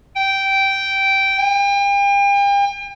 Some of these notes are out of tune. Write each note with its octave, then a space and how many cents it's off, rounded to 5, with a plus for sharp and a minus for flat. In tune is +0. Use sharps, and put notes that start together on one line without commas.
G5 -10
G5 +40